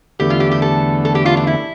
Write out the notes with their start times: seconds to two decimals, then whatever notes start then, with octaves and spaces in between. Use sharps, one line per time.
0.19 E2 D3 A3 G4
0.30 F4
0.40 G4
0.51 G4
0.62 A4
1.05 A4
1.15 G4
1.26 F4
1.37 D4
1.47 E4